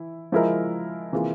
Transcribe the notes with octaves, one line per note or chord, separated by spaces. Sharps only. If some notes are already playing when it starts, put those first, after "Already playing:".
Already playing: E3 E4
F3 G#3 E4 A#4
C3 E3 A#3 F4 G#4